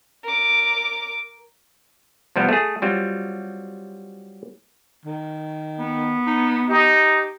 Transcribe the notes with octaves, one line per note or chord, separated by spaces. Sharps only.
A#4 D6
C3 F3 G3 B3
A3 G#4
F#3 G3 C4 F4
D#3
B3
D#4
D#4 G4